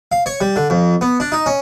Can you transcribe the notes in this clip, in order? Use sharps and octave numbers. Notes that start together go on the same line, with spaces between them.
F5
C#5
G3
D3
F2
B3
D4
D#4
C#4